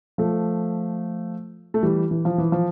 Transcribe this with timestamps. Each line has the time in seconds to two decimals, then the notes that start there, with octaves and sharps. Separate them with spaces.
0.18 F3 A3
1.74 A3
1.83 E3 G3
2.11 E3
2.25 F3
2.38 E3
2.52 F3